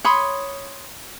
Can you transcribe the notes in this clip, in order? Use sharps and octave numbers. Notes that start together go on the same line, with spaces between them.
C#5 B5 C6 D#6